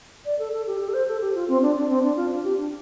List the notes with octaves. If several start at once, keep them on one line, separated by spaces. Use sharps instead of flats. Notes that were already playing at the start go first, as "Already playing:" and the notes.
D5
A4
A4
G4
G4
A4
C5
A4
G4
F4
C4
D4
D4
C4
D4
F4
D4
G4
D4